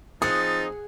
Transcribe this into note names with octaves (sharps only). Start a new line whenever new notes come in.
F3 C4 D#4 G#4 F#5 D#6 A6